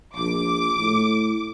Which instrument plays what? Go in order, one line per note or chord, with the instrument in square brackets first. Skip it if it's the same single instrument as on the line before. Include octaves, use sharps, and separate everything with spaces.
[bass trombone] A#1 [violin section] D6
[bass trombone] A2